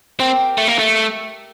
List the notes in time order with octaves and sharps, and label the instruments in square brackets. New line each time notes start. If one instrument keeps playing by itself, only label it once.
[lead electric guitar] C4 [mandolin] G4 A#4
[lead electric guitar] A3
A#3
A3